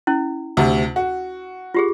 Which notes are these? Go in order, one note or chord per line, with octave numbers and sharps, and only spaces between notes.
C#4 E4
D2 C3
F#4
F4 G4 G#4